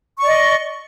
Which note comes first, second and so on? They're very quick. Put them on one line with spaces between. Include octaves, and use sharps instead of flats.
C#6 D5 D#5